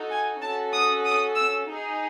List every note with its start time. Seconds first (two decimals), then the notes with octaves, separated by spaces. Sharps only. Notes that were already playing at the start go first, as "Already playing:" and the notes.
Already playing: D#4 F#4 A4
0.11 G#5
0.42 C#4 F#4 A4 A5
0.73 D#6
1.05 D#6
1.36 E6
1.68 D#4 G#4